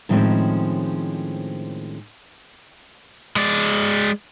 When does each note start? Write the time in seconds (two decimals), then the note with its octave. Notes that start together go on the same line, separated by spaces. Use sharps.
0.09 A2 D#3 F3 G#3 C4 C#4
3.36 G#3 D5